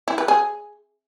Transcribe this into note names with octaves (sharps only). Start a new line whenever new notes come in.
E4
B4
G#4